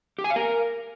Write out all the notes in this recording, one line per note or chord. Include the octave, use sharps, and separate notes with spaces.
G4
G#5
F5
A#4